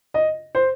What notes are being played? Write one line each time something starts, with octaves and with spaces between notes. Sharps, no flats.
D#5
C5